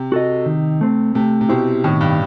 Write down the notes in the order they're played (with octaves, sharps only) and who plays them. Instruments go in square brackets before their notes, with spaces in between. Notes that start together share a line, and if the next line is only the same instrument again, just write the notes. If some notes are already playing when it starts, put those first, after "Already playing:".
Already playing: [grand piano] C3
[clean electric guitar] F#4 A4 D#5
D#3
A3 C4
[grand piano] C3 [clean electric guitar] A3
[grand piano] C3
[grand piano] B2 [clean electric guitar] E4 G4 C5
[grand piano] A2 [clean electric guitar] D#3
[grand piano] G2